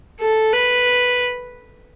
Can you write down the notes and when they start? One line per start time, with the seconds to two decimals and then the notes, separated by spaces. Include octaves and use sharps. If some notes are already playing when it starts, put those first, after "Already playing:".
0.21 A4
0.53 B4